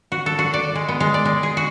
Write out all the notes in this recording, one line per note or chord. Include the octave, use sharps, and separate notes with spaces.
F#4
A4
F#4
D5
G#3
B3
G#3
D5
G#3
G#4
F#4